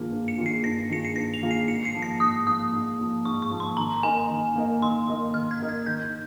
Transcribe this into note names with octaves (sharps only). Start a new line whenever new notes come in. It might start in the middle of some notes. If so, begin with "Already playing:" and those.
Already playing: G2 D#3 A#3 F4 G#4
G2
C#7
D#3 A#3 F4 G#4
C7
G2 A#6
D#3 A#3 F4 G#4 C#7
C7
G2 A#6
F7
D#3 A#3 F4 G#4
C7
G#2 C#7
C7
F3 A#3
A#6
G#2 D#6
F3 A#3 D#6
G#2
F3 A#3
G#2 C#6
C#6
F3 A#3
C6
D#3 A#5
A#3 D#4 A#4 D#5 G#5
D#3
A#3 D#4 A#4 D#5
D#3 C6
A#3 D#4 A#4 D#5
D#3 F6
G#6
A#3 D#4 A#4 D#5
G#6
D#3 G6